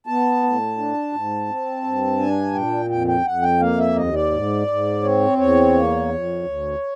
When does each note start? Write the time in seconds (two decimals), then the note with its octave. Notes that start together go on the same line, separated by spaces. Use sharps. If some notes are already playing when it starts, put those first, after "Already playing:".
0.07 B3 A5
0.43 A2
0.78 D4
1.13 G#2
1.49 C4
1.84 G2
2.19 D4 G#5
2.54 A#2 G5
2.89 F2 G5
3.07 G5
3.26 F2 F#5
3.42 G5
3.60 A#3 F5
3.78 E5
3.96 D#2 D#5
4.14 D5
4.31 G#2
4.67 G#2
5.03 C4 C#5
5.37 E2 C#5
5.72 A#3
6.08 F2
6.43 D2